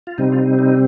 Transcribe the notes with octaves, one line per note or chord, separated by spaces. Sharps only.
F4
C3 G3 C4 D#4
F4
D#4
D#4